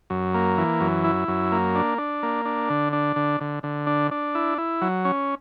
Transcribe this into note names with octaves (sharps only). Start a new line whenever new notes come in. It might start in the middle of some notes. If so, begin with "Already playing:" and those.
F#2
A#3
E3
F#2
E4
F#2
A#3
D4
D4
A#3
D4
D3
D4
D3
D3
D3
D4
D4
E4
E4
F#3
C#4